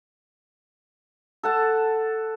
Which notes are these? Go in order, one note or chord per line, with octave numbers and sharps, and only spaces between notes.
A4 F#5 A5